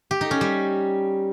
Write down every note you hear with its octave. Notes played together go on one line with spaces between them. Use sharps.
G4
D#4
C#4
G3